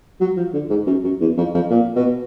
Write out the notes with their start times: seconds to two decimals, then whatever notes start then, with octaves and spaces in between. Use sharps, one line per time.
0.20 F#3
0.37 F3
0.53 D3
0.70 G#2
0.87 F#2
1.04 F#2
1.21 E2
1.37 F2
1.54 F2
1.70 A#2
1.96 B2